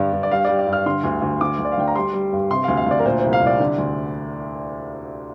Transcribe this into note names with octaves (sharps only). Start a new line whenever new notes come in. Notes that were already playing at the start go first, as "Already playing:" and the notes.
Already playing: G2 D3 D5
G2
D5
G3 F5
G3 D5
D5
G2
F6
D3 C6
D2
D2
D3 D6
D2
D5
F5
D2 G5
A#5
G3 C6
G3
G2
C3 C6
D2 F5
F5
D2 D5
A#4
A#2 C5
C2 C5
F5
C2
D5
D3
D2